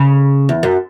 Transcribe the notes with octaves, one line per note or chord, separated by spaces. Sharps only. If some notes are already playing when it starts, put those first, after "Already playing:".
Already playing: C#3
E2
F#2